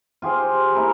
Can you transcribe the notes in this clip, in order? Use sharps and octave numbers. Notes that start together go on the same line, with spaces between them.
F4 G4 G#4 C5
A#3 E4 A#4